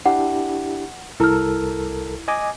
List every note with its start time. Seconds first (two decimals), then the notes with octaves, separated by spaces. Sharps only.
0.06 D4 E4 G4 F#5
1.20 C2 E4 A4 A#4 F6
2.28 D#5 G#5 D6